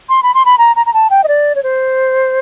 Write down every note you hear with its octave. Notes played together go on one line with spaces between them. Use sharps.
C6
B5
C6
B5
A#5
A#5
A#5
A5
G5
D#5
D5
C#5
C5